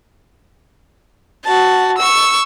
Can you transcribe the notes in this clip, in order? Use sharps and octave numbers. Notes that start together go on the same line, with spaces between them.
F#4 A5
C#6 E6